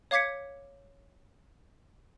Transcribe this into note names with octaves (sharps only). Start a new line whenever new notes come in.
C#5 F5 D6 G#6 B6 C#7